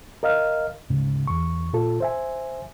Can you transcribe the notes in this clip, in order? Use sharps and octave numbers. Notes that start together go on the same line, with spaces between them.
A#4 D#5 F5 F6
D2 G#2 C#3
E2 C#6
A#2 F4 A4
C5 E5 G#5